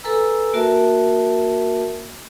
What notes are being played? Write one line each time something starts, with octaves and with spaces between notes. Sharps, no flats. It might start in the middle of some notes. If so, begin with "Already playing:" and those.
A4 B4 G#5 A#5 E6
A#3 F#4 A#4 E5 A5